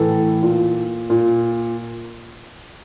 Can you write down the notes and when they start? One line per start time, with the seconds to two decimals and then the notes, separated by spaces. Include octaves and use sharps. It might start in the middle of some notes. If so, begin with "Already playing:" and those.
Already playing: A2 E3 A4
0.42 A#2
1.10 A#2